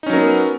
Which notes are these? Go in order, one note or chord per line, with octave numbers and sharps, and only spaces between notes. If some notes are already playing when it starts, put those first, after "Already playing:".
F#3 B3 C#4 D#4 A#4